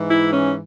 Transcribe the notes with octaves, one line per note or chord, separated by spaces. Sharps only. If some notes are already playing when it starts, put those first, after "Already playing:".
Already playing: G#2 E3
E4
C#4